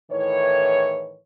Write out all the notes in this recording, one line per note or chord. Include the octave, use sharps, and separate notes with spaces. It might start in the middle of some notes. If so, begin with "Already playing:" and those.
A2 D#3 E3 C#5